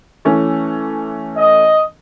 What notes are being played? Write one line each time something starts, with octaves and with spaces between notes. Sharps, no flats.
E3 A3 C#4
D#5